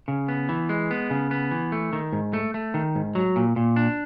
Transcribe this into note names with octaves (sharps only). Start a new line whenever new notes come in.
C#3
B3
E3
G#3
B3
C#3
B3
E3
A3
D#3
G#2
A3
A3
D#3
G#2
F#3
A#2
A#2
D4